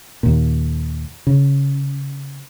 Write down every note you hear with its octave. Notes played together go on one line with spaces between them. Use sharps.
D#2 A#2
C#3